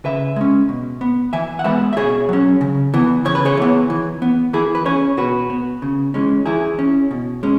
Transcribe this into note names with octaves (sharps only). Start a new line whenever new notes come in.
C#3 B4 E5
G#3 C#4
B2
B3
E3 E5 G#5
F#5
G#3 B3 B4 E5
E5
B2 G#4 C#5
F#3 C#4
C#3
E3 B3
C#3 C#5
B4
G#4 C#5
E3 B3
E3
B3
E3 E4 G#4
B4
C#4 G#4 C#5
B2 F#4 B4
B3
C#3
E3 G#3 C#4
E3 E4 G#4
C#4
B2
G#3 C#4